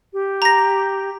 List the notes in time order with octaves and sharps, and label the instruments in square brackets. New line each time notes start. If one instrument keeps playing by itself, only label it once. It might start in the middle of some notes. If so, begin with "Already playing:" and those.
[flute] G4
[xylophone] A#5 A#6